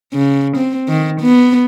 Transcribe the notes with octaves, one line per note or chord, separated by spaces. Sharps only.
C#3
C4
D#3
B3